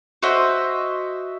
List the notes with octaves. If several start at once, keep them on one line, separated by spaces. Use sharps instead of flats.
F#4 C5 D#5 E5